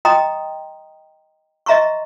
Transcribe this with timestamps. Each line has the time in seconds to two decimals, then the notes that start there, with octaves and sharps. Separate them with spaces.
0.05 D#5 G5 A#5 C6 D#6
1.66 D#5 E5 A#5 C6 C#6